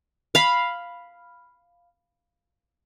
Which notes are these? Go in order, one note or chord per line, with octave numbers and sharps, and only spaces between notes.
F5 B5